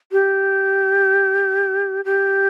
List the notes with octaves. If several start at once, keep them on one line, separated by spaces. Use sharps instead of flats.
G4
G4